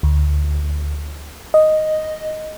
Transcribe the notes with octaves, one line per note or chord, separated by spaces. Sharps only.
D2
D#5